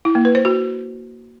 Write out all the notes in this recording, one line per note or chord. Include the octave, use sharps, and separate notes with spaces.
E4
A#3
B4
C5
F#4